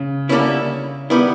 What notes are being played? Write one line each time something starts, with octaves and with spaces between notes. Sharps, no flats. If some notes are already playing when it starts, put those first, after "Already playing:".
Already playing: C#3
D3 G3 A#3 C#4 E4
D#3 G3 B3 E4